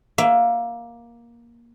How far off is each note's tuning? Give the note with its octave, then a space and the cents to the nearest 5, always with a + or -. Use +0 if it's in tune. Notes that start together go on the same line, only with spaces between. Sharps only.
A#3 +15 E5 +15